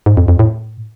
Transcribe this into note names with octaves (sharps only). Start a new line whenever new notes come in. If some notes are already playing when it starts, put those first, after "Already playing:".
G#2
F2
F2
A2